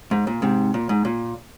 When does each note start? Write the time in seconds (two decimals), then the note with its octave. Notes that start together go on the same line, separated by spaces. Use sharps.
0.11 G#2
0.27 A#2
0.42 G#2 C3
0.74 A#2
0.89 G#2
1.05 A#2